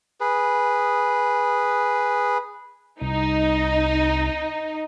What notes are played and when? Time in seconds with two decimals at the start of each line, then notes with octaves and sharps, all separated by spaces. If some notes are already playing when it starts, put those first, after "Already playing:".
0.21 G#4 B4
3.01 C2 D#4